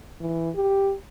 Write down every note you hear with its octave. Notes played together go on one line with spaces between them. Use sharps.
E3
G4